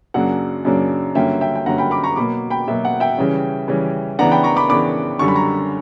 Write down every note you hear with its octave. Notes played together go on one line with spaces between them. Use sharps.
F#2 C#3 F#3 A#3 D4 F#5
F#2 C#3 F#3 A#3 D4
G2 D3 F#3 A#3 C#4 E5 G5
E5 G5
G5
G2 D3 F#3 A#3 C#4 F#5 A#5
G5 B5
B5 D6
A#5 C#6
B2 F#3 A#3 B5 D6
G5 B5
B2 F#3 A#3 E5
F#5
E5 G5
C#3 E3 G3 C#4
C#3 E3 G3 C#4
C#3 E3 B3 D4 F#5 A#5
G5 B5
A#5 C#6
B5 D6
C#3 E3 B3 D4 B5 D6
F#2 D3 G3 C#6
B5
A#5 C#6